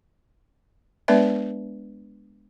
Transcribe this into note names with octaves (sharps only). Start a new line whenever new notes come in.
G#3 B3 D4 B4 D5 E5